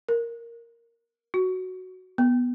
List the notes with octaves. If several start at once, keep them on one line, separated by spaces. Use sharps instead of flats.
A#4
F#4
B3